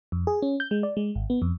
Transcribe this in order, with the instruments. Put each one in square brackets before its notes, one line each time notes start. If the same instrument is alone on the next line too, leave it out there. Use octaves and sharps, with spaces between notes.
[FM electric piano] F2
G#4
C#4
G6
G#3
D5
G#3
G#1
B3
F2